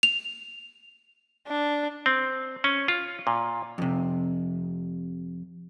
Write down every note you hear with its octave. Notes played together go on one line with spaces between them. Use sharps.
F7
D4
C4
C#4
F4
A#2
F2 C3